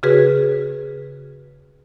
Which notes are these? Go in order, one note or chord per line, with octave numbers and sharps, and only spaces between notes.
C#3 F#4 G#4 B4